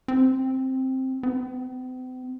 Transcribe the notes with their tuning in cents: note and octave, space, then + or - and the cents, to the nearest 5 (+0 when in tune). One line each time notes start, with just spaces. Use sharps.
C4 +5
C4 -45